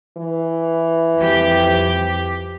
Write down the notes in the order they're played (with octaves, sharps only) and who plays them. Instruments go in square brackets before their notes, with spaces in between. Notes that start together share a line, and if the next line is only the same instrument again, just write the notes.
[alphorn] E3
[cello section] F2 G4